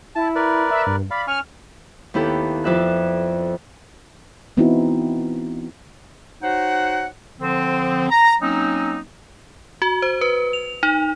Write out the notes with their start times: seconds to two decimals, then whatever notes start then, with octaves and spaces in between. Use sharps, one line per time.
0.15 E4 A5
0.35 A#4 B4 D5
0.71 E5
0.87 G2
1.11 D5 F5 B5
1.27 C#4 G#5 C#6 F6
2.14 D#2 B3 E4 G4 A4
2.64 F2 D5 E5 F#6
4.57 E3 B3 C4 D#4 E4 F#4
6.43 D#4 F#4 C5 C#5 F#5
7.40 D3 F3 C4
8.10 A#5
8.41 F#3 A#3 C4 C#4 D#4
9.82 F#4
10.02 C5
10.21 B4
10.53 F7
10.83 D#4